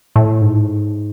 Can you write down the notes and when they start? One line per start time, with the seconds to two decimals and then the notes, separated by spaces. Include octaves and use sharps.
0.16 A2
0.41 G#2